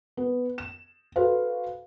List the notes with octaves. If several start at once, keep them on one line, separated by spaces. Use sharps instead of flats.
B3
E7
F#4 A4 B4 C5 F5